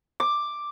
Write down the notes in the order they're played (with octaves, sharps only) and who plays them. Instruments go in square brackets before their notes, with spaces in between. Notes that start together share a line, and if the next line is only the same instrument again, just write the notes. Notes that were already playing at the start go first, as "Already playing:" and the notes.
[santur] D6